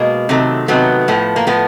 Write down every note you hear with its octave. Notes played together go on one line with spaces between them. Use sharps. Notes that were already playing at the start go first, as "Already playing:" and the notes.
Already playing: B2 G#3 A#3
C3 D#3 F#3 A3
C3 D#3 F#3 A3 B3
A2 F3 A3
A#3
A2 F3 A3 B3